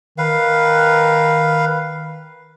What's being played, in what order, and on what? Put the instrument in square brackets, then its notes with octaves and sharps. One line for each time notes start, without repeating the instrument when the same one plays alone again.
[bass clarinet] D#3 [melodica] B4 F5